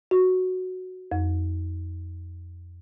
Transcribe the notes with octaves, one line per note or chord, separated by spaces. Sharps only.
F#4
F2